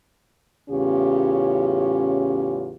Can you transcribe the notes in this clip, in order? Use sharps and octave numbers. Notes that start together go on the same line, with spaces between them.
E2 A2 C#3 C#4 F4 G4